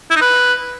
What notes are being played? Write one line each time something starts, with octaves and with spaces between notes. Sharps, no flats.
E4
D#4
B4